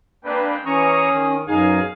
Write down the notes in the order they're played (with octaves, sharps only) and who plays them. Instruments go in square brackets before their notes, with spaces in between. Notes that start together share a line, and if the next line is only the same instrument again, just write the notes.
[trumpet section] G#3 C4 G5 [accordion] A#3 D4 B4
[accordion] E3 A#5 C#6 [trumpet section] A#3 G#4 D#6 [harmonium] C#4
[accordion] D#3
[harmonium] F#2 D#4 G#4 [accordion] B2 [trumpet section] F5 G#5